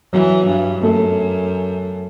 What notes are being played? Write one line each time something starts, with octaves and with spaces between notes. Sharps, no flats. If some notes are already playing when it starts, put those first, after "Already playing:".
E3 F#3
G2
F#2 A3